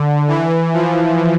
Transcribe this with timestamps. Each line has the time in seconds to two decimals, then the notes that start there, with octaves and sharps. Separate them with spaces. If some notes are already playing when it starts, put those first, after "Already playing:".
Already playing: D3
0.28 E3
0.74 F3